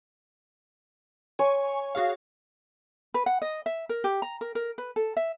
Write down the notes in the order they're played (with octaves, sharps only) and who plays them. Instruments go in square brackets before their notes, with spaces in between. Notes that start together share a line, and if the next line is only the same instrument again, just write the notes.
[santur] C#5 [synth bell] G#5 C#6
[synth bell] F#4 G#4 F5
[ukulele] B4
F#5
D#5
E5
A#4
G4
A#5
A#4
A#4
B4
A4
E5